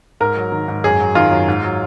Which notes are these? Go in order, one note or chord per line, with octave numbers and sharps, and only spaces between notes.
G#2 A#4
F#3
D#3
G#2
F#2 G#4
F#3
D#3 F4
F#2
G#2
F#3